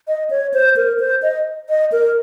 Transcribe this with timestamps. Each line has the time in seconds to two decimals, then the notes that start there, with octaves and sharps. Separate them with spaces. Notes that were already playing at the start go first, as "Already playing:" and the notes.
0.08 D#5
0.30 C#5
0.54 C5
0.76 A#4
0.99 C5
1.22 D#5
1.69 D#5
1.92 A#4